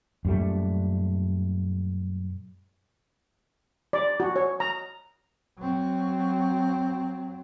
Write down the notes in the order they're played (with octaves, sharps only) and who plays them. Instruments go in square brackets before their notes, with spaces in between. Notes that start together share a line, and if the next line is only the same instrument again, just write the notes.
[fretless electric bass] F#2 A#2 G3 A3
[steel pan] D5
F#4
C#5
A#5
[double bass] F#3 C4